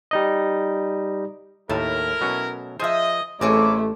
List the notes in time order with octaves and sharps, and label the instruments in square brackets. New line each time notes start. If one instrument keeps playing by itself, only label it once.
[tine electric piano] G3 D#4 D#5
[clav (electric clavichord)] D#2 A2 A5 [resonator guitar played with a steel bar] A3 [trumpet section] E4 A#4
[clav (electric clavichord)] B2 F#3 C#4
[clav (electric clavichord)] F3 C5 [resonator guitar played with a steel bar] G#4 E5 [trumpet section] D#5
[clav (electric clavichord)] A1 [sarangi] A3 [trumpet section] A#3 E4 D6 [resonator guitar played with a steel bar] C4 G#4 C#5